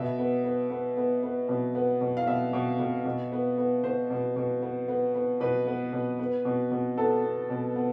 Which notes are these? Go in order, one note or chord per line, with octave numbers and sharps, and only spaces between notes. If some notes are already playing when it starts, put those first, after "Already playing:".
Already playing: B2 E5
B3
B3
B3
B3
B3
B2
B3
B2
F5
B2 E5
B2
B2
B2
B3
B3
B3 C5
B2
B2
B3
B3
B3
B2 B4
B3
B2
B3
B2
B2
B3 A4
B3
B2
B3